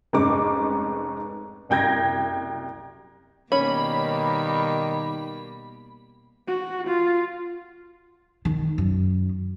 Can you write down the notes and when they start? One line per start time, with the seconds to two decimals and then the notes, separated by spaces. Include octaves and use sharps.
0.13 F1 G#2 C#4 D6
1.69 F#1 C2 G5 G6 G#6 A#6
3.52 B2 D#3 G3 A#3 C#4 B5
6.48 F#4
6.87 F4
8.45 D#3
8.78 F#2